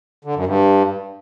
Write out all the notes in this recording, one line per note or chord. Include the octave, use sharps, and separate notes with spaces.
D3
F#2
G2